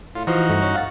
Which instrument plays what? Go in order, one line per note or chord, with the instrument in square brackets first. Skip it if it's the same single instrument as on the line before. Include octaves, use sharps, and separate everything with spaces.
[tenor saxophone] A2 [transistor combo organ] F4
[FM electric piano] E3 [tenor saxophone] F3 [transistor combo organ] D#4 F#4
[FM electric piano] G2 [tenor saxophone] A3
[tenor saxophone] C#4
[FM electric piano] F5 F#5 A6